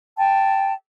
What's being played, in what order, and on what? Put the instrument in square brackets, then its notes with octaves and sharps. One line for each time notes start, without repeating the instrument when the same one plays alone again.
[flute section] G5 A5